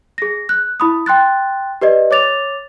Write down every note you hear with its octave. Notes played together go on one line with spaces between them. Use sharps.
G#4 A#6
F#6
E4 B5 D#6
G5 C6 F#6 A6
G4 B4 D5 D#5
C#5 D6 A6 F7